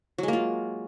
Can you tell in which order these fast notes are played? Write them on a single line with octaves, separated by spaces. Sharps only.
F#3 G#3 A#3 F4